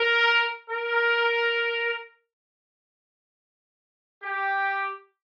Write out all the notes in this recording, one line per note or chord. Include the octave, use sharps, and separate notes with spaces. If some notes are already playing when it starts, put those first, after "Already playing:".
Already playing: A#4
A#4
G4